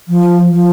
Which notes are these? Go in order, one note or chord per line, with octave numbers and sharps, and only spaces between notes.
F3
F3